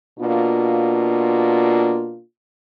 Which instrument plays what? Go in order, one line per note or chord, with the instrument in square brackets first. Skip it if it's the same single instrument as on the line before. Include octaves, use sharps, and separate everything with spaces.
[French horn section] B2 A#3 D4 F4